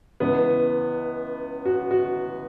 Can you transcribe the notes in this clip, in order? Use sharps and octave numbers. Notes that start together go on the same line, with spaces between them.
C#2 C#3 E3 B3
F#4
F#4